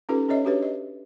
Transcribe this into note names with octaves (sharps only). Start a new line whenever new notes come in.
C#4 D#4 F4 G4 A4 B4
C#4 A4 C#5 D#5 E5
D4 F#4 G4 B4 C#5
D#5